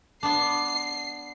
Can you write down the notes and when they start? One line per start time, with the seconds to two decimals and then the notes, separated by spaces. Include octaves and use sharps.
0.23 B3 D4 C7